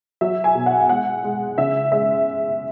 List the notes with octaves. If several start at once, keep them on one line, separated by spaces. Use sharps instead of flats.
F#3 E5
G#5
B2
F#5
G#3 F#5
G#3
C#3 E5
G#3 E5